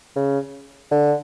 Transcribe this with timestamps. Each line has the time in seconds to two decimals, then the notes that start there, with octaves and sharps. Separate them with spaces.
0.16 C#3
0.91 D3